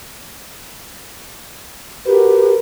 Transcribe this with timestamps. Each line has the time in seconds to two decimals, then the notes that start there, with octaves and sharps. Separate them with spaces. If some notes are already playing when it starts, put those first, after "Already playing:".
2.06 F#4 G4 A#4 B4